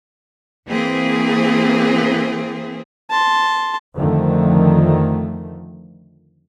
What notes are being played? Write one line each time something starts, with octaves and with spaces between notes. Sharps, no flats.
E3 A#3 C4 G#4
A5 C6
F2 D3 D#3 F3 A3